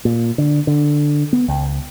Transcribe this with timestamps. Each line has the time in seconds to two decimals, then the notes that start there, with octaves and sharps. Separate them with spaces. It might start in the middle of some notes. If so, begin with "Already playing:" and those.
0.05 A#2
0.38 D3
0.67 D3
1.33 B3
1.48 C#2